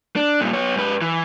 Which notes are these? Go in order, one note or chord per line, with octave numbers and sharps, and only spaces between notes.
D4
G2 A#2
B3 C#5
G#2 B4
E3